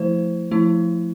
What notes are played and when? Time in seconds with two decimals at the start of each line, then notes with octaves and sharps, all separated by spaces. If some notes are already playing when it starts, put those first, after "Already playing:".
Already playing: F3 A3 E4 C5
0.51 F3 A3 E4